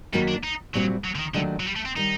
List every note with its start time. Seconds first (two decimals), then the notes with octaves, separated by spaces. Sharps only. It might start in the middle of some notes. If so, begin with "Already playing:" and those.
0.13 F#2 D#3 F#3 G3 A#3 F#4
0.28 D4
0.44 D#4
0.74 A#2 F#3 G3 C4 F#4
1.04 F#3
1.15 D3
1.19 D#3
1.34 D#2 D3 D#3 F#3 A3 D4
1.60 F#3
1.66 G3
1.76 A3
1.85 C4
1.96 D#3 G3 D#4